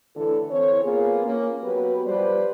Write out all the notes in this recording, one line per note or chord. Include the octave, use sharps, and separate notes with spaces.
A2 D3 E3 D4 A4
E3 C4 C#5
A#3 B3 F4 G#4
A#3 C#4
F#3 B3 G4 B4
F3 G3 B4 C5 D5